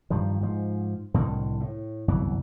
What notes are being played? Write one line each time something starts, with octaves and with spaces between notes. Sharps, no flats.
G2 D#3 F3
G#2 F3
C2 A2 D3 D#3
A2
G1 C2 F#2 E3